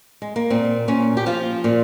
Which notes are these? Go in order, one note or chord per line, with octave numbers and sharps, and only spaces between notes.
G#3
A#3
A#2 C4
A#2 C#4
G4
F3 F4
A#2